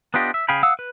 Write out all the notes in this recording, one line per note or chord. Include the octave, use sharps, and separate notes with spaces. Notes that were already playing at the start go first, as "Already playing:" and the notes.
B3 D4 F4 G4 D#5
E5
C#3 G#4 F5 G5 B5
F5 F#5 D#6 E6
B4